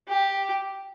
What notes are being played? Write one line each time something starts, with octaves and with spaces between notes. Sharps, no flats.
G4